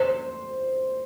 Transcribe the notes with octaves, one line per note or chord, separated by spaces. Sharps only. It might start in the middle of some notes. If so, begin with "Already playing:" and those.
Already playing: C5